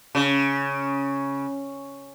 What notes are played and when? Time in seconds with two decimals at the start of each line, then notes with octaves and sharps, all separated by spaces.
0.15 C#3